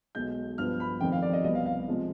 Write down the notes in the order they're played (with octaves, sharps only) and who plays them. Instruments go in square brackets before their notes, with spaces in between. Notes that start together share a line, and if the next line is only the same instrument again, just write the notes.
[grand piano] B1 B2 G#3 G6
G2 F3 B3 F6
B5
F1 F2 D#3 G5
F5
D5
D#5
C2 B2 G3 B3 D#5
F5
F5
C3 F3 G#3